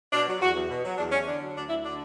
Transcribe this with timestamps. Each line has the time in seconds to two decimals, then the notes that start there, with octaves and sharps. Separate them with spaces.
0.13 B2 D4
0.27 F#3
0.41 E2 F#4
0.55 E2
0.70 B2
0.84 F#3
0.98 E2 D4
1.12 E2 C#4
1.27 D3 D4
1.42 F#3
1.55 D2 D4
1.69 D2 E4
1.84 D3 D4